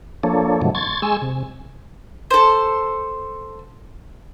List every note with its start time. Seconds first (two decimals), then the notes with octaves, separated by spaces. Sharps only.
0.23 F3 A#3 D4 A4 C#5
0.62 G#2 C3 D#3 F3 F#3 A3
0.75 C6 C#6 G#6 A6
1.02 G#3 G#4 G#5 C6 C#6 E6
1.22 C3
2.31 A4 C5